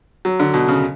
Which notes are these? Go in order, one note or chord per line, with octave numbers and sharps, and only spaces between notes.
F#3
D3
B2
C#3